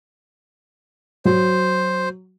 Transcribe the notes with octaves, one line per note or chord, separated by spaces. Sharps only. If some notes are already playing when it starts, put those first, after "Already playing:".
F#3 C5